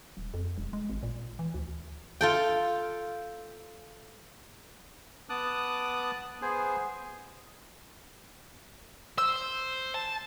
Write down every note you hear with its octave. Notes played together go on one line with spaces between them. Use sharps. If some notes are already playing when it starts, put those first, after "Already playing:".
D#1
F2
E1
G#3
G#1
A#2
E3
D2
F4 A4 G5
B3 A5 D6 D#6 F#6
B3 G#4 C5 G#5
C5 E6
A5